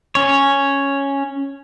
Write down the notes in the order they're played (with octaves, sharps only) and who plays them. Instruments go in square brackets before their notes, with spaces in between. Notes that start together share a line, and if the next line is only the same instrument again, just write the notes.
[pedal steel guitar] C#4 C#5